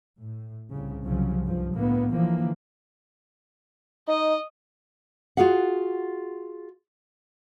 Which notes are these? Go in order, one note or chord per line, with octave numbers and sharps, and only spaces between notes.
A2
C2 C#3
C2 C#3 F3 F#3
B1 G2 F3
A2 D3 A#3 B3
D3 E3 F3 A#3
D#4 D#5
F4 F#4 G#4 F5 F#5